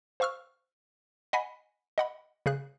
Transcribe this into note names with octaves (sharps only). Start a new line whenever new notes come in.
C5 F5 C#6 E6 F6
D#5 F#5 G#5 B5 B6
D#5 F#5 B5
C#3 G#4 F#6